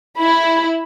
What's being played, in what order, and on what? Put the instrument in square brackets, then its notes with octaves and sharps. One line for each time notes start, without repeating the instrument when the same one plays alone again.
[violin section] E4 [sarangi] B5